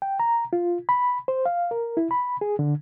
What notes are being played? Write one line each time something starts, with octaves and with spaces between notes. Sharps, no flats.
G5
A#5
F4
B5
C5
F5
A#4
E4
B5
G#4
D3